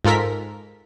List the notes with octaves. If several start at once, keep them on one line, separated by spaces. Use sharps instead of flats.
G#2 F4 A4 A#4 B6